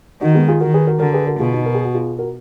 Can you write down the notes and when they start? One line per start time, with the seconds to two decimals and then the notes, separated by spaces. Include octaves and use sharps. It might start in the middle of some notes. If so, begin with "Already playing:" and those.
0.21 D#3 D#4 F#4
0.35 G#3 B3
0.48 F4 G#4
0.60 D#3 F#4 A#4
0.74 G#4 B4
0.87 F#4 A#4
1.00 D3 F#4 A#4
1.13 G#4 B4
1.27 F#4 A#4
1.39 B2 F4 G#4
1.52 D#4 F#4
1.66 A#4
1.74 G#4
1.85 F#4
1.94 F4 G#4
2.18 F#4 A#4